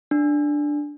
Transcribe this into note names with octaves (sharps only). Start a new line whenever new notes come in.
D4